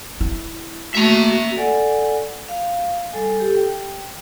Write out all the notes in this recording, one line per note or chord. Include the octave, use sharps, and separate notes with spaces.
E4
A3 A#3 F#4 E5 A#5
A4 D5 F#5 G#5
F5
G3 A4 G#5
G4 A4
G5